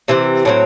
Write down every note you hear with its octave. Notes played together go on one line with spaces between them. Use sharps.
C3 E3 C4
A2 F#3 C4